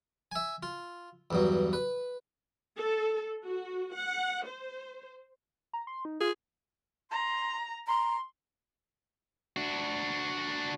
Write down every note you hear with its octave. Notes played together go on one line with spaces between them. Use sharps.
E5 G#5
F4
E2 G2 F#3
B4
A4
F#4
F#5
C5
A#5
C6
D#4
F4 G#4
A#5 C6
A#5 C6
D4 F#4